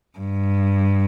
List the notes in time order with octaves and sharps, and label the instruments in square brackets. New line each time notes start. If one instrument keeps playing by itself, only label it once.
[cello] G2